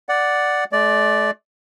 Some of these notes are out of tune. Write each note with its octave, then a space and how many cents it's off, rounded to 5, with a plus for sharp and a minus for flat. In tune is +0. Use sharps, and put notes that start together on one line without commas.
D5 +0 F#5 +0
A3 -45 D5 +0